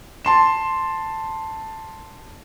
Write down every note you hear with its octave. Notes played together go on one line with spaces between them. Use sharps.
A5 C6 E7